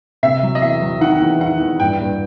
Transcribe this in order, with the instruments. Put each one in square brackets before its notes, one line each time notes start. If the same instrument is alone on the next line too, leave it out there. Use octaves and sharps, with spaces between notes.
[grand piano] C3 [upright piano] E5
[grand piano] F#3
[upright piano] D#5
[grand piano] E2 [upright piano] E5
[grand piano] F#3
[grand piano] D#3 [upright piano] F#5
[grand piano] E2
[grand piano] D#3 [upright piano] F#5
[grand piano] E2
[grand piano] G2 [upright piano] G5
[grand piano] G2